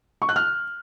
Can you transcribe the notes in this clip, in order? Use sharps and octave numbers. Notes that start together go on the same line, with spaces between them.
C#6
F#6
F6